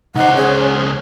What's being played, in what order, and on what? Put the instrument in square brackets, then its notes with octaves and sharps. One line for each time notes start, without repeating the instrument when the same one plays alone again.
[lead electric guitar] C#2 C5 [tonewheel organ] D#4 [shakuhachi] F#5
[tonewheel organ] C#4 [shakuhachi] G#4